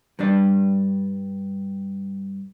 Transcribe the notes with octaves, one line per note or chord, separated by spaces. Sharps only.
G2 G3 D4 D5